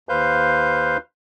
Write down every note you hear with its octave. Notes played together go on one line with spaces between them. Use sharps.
D#2 B4 C5 F5 G6